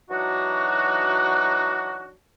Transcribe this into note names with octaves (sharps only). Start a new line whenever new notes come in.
E3 F#3 D4 D#4 F#4